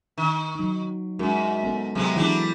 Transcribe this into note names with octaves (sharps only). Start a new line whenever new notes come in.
D#3
F#3 D#4
F#2 G#3 F#4 A#4
B3 C#4 A4
C3 F#3 G#3 B3
E3 F#3 G3 D4 E4